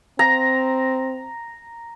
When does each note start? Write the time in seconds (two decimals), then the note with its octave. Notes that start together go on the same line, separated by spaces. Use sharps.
0.19 C4 A#5